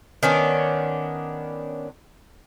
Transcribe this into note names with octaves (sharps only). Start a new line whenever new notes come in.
D#3 B3 C#4 D4